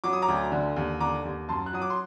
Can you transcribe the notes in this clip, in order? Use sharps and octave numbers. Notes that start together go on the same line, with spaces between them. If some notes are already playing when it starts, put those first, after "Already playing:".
F#3 D6
D#6
A#5 D6
D2
D3
D#2
D3 A#5 D6
D#2
F#2 A5 C6
F#6
F#3 D#6
D6
C6